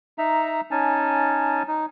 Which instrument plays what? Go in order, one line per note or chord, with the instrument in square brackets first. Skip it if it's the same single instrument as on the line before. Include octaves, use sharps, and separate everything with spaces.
[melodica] D#4 E5 A#5
C#4 D#4 G#5 A5
D#4